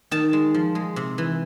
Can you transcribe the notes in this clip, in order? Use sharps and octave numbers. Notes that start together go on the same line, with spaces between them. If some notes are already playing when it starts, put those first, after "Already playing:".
D#3 A5
G#3
F3
G#3
C3
E3